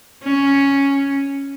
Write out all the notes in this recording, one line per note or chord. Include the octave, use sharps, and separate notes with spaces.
C#4